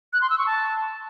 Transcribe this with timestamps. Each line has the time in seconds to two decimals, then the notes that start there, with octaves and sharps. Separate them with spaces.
0.13 F#6
0.21 C6
0.30 E6
0.38 C#6
0.47 A5